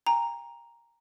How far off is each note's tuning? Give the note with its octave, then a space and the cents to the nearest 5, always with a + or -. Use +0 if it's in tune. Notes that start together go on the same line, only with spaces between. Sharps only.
G5 +40 A#5 +0